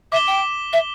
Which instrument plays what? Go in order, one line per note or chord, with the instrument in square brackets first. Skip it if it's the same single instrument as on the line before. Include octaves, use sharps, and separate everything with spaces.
[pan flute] E5 [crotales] D6 B6 E7 G7
[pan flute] G5
E5